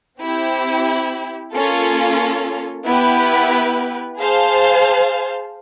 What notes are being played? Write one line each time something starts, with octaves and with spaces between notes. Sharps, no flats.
C4 E4 G4
A#3 C#4 F4 A4
B3 E4 G4 B4
G#4 C5 F5 A5